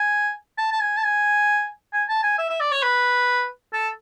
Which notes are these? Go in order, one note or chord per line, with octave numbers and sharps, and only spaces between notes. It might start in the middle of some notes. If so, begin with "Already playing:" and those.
Already playing: G#5
A5
A5
G#5
A5
G#5
G#5
A5
G#5
E5
E5
D5
C#5
B4
A4